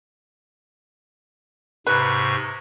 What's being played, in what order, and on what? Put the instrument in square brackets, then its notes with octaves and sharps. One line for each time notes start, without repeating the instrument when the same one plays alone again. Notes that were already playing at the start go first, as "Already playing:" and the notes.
[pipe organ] G#2 C3 C#6 [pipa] B4